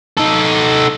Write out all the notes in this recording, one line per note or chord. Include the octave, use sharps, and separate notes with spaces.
D#4 A4